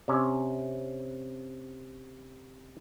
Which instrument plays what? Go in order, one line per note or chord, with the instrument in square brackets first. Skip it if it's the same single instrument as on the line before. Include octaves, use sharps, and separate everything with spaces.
[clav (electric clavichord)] C3 C#4